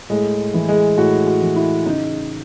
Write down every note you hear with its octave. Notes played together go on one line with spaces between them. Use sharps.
A2 G#3
E3
G#3
A2 F#4
F#4
E3
E4
C#3 D#4